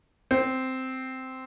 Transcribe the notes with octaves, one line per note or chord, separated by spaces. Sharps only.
C4